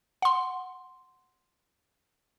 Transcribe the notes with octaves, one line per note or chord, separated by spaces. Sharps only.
F#5 C6